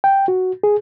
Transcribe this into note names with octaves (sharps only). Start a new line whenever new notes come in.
G5
F#4
G#4